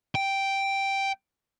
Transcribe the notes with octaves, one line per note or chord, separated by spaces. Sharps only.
G5